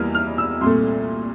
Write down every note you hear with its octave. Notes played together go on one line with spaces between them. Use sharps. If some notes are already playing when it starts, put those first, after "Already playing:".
Already playing: E2 E3 G3 A#3 F6
F6
E6
C2 A#2 A3 C6